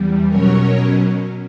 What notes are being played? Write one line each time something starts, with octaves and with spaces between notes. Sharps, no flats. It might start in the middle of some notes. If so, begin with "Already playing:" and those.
Already playing: E2 G3
B2 F#3 C#4 A#4 C#5